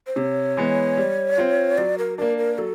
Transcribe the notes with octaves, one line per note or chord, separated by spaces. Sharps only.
C5
C3 C#5
E3 G#3 B3
G3
C4 F4
F#3 D5
A#4
A#3 D4 A#4
A#4
F#3 A4